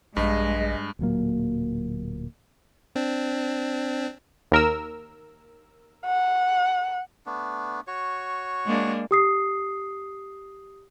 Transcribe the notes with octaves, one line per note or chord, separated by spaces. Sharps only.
A#1 G2 G#3 D#5
D1 A#2 F#3 A#3
C4 D4
D#2 A#4 E6
F#5
A3 B3 D4
F#4 C#5 C#6
G#3 A#3 D4
G4 D#6 C7